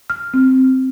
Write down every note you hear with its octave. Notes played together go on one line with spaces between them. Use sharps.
F6
C4